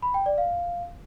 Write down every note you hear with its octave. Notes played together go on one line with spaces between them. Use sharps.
B5
G5
D5
F5